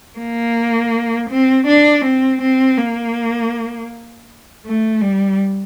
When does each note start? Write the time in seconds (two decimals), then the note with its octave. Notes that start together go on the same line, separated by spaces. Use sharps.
0.18 A#3
1.30 C4
1.67 D4
2.05 C4
2.42 C4
2.78 A#3
4.66 A3
5.02 G3